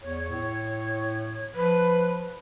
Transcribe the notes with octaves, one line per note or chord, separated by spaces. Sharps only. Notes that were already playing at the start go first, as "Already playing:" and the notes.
E2 C#5
A2
F3 B4